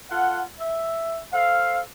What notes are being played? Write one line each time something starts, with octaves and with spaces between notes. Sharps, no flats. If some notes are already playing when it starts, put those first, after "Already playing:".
F4 A4 F#5
E5
A4 C5 F5